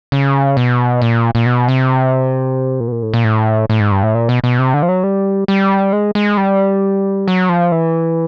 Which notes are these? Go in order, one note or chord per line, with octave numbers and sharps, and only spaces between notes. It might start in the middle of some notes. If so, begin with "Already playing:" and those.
C#3
B2
A#2
A#2
B2
C3
A#2
B2
A#2
A2
A#2
A2
A2
G#2
G2
A2
A#2
B2
B2
C3
D3
F3
F#3
G3
G3
G#3
G#3
G3
F#3
F3
E3